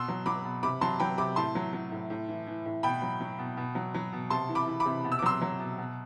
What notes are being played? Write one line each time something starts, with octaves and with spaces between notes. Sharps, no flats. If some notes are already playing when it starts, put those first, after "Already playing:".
Already playing: B2 C6 E6
F#3
F#3 B5 D6
B2
C3 B5 D6
F#3 A5 C6
F#3 G5 B5
C3 B5 D6
A2 A5 C6
F#3
F#3
A2
A2
E3
E3
A2
B2 G5 B5
F#3
F#3
B2
B2
F#3
F#3
B2
C3 A5 C6
E3
B5 D6
E3
B5 D6
C3
B2
E6
D6
F#3 C6 E6
F#3
B2
B2